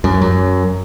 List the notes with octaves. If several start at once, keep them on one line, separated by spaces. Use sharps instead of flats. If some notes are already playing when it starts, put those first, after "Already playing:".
F#2
F#2